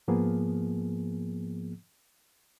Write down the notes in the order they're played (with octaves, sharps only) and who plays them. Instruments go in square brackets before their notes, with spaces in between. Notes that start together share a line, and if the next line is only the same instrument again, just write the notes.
[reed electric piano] G#2 F3 A#3 B3 G#4